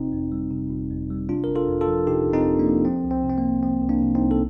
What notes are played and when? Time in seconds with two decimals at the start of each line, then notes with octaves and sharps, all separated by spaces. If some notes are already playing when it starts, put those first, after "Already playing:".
Already playing: G1 C3 C4 D#4
0.13 F2
0.32 G3
0.51 C3
0.70 G1
0.90 F2
1.10 G3
1.29 C3 D4 F4
1.44 G1 A#4
1.55 F4 A4
1.68 F2
1.81 F4 A4
1.88 F3
2.07 C3 D#4 G4
2.27 G1
2.33 C4 D#4
2.46 F2
2.59 A#3 D4
2.66 F3
2.85 F3 C4
3.04 C2
3.11 C4
3.24 C3
3.29 C4
3.38 A#3
3.44 C2
3.63 F3 C4
3.82 C2
3.89 A#3 D4
4.02 C3
4.15 C4 D#4
4.22 C2
4.31 A4